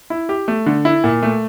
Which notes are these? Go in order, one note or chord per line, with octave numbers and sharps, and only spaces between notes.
E4
G4
A3
D3
E4
A#2
A3